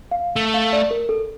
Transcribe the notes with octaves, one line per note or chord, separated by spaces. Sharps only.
F5
A3
F5
D5
A#4
A4